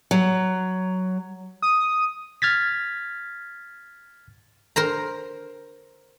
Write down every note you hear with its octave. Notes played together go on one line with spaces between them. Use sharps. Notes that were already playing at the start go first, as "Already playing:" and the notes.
F#3
D#6
F6 G#6 A6 B6
A#4 C5 A#5